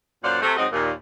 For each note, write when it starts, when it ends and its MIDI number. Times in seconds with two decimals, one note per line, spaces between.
0.22 0.37 42
0.22 0.37 46
0.22 0.37 72
0.22 0.37 74
0.22 0.37 77
0.22 0.37 78
0.41 0.53 48
0.41 0.53 57
0.56 0.65 44
0.56 0.65 54
0.56 0.65 60
0.56 0.65 75
0.71 0.90 39
0.71 0.90 46